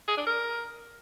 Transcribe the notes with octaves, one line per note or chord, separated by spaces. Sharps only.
G#4
D4
A#4